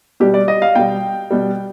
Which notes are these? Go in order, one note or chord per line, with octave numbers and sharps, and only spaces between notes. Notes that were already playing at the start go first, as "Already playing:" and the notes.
B2 G3 G4
D5
D#5
F5
B2 G3 G5
B2 G3